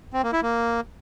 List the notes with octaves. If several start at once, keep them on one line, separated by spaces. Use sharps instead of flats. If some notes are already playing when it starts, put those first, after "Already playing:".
C4
A#3
E4
A#3